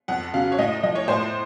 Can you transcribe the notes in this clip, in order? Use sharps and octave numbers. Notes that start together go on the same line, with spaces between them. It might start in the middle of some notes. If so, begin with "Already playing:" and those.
F2 F#5
C#3 F#3 F5
C#5
A2 D#5
F3 D#5
C#5
A2 C5